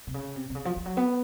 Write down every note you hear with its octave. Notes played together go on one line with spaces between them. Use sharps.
C3
C#3
C3
C3
C#3
F3
F3
F#3
B3